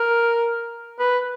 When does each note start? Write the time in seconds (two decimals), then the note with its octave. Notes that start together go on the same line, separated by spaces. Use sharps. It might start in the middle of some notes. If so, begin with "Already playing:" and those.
Already playing: A#4
0.99 B4